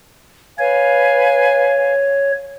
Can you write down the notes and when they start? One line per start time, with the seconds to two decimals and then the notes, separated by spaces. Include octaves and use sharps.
0.58 B4 C#5 F5 G#5